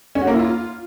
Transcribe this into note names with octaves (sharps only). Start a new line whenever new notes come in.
C#4
F#4
A#3
E4
F4